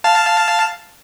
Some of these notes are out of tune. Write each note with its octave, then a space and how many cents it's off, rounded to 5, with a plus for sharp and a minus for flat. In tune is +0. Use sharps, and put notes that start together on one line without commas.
F5 -5 A5 +0